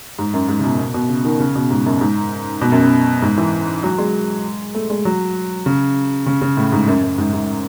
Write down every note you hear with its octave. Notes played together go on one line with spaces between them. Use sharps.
G#2
F#2
G#2
C#3
B2
B2
B2
C#3
D#3
C#3
B2
G#2
F#2
G#2
B2
F#2
F#2
G#2
E3
F#3
G#3
A3
G#3
F#3
C#3
C#3
C#3
A2
G#2
F#2
F#2
G#2
G#2